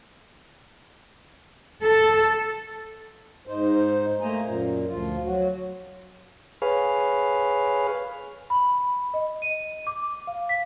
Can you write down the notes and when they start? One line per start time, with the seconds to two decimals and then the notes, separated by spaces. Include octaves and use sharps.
1.82 A4
3.47 G#2 D#4 C5
4.21 A3 A#3 C5 D#5 G#5 A#5
4.43 F#2 A#2
4.87 D2 F3 F4
5.25 F#3 F#4
6.62 G#4 B4 C#5 F5
8.50 B5
9.14 D#5
9.42 D#7
9.87 D6
10.27 F5
10.49 B6